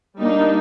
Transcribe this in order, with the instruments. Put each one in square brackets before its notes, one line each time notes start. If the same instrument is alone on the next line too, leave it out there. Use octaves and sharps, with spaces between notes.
[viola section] G3 A#3 D4 D#4